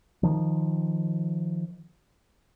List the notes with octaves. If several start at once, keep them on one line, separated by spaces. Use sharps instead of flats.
D#3 F3